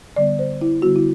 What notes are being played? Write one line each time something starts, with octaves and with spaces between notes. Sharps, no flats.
D3 G3 B3 D5
C5
E4
D3 G3 B3 F#4
E4